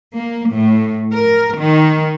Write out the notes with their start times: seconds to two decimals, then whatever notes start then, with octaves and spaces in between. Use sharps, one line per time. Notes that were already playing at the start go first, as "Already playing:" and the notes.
0.15 A#3
0.53 A2
1.13 A#4
1.56 D#3